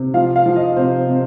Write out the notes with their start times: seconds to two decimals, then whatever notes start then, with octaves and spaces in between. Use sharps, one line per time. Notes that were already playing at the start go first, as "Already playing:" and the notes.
Already playing: C3
0.14 F3 F5
0.36 F5
0.46 F3
0.56 D#5
0.76 C3 C5
1.08 C3